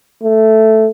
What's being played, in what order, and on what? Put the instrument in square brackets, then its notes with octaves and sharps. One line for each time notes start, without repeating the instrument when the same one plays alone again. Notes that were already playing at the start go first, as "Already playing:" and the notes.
[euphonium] A3